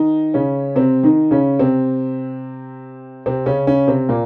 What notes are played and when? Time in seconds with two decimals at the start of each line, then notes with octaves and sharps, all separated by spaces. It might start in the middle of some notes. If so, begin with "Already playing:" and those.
Already playing: D#3 D#4
0.34 C#3 C#4
0.75 C3 C4
1.03 D#3 D#4
1.31 C#3 C#4
1.59 C3 C4
3.26 C3 C4
3.46 C#3 C#4
3.67 C#3 C#4
3.88 C3 C4
4.09 A#2 A#3